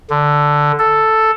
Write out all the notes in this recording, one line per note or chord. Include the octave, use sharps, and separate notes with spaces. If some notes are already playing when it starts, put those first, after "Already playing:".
D3
A4